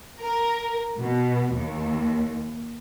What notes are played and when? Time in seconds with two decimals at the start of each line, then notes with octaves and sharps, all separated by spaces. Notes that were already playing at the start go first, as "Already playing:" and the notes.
0.20 A#4
0.99 B2
1.53 D#2